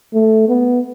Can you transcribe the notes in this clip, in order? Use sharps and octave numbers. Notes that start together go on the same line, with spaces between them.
A3
B3